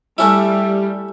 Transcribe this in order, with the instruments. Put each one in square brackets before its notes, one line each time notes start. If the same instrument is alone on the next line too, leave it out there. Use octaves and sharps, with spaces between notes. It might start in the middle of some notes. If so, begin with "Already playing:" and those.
[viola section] G3 [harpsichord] A3 C#4 E4